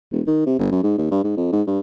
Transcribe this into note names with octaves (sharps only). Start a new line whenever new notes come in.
E1
D#3
C3
G1
F#2
G#2
D#2
G2
G#2
F2
G#2
G2